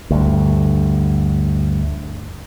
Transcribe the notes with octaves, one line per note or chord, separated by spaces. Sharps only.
D2 G2